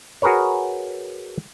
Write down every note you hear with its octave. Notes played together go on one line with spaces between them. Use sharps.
F#4 G#4 A#4 B4 C#5